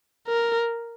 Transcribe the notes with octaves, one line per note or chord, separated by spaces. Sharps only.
A#4